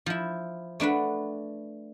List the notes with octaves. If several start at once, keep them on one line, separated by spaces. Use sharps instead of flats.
F3 E4
A3 D4 B4 F#5